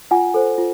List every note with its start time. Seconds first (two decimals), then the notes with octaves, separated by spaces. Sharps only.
0.11 F4 F#5 G#5
0.34 A4 C5
0.58 F4